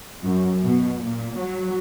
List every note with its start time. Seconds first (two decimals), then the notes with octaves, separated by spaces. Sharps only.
0.23 F#2
0.65 B2
1.02 A#2
1.39 F#3